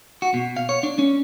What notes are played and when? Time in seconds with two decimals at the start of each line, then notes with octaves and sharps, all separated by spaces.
0.22 F#4
0.34 B2
0.57 F5
0.69 C#5
0.83 D4
0.99 C#4